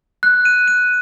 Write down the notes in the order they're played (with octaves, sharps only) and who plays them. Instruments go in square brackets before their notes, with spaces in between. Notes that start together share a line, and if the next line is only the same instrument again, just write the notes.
[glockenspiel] F#6
D#7
D#7